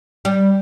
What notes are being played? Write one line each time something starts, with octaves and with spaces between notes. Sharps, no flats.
G3